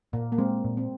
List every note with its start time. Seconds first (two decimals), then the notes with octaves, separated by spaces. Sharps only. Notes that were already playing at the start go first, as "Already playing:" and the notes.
0.13 A#2 A#3
0.32 A#3
0.38 G#3 C4
0.65 A#2
0.77 C4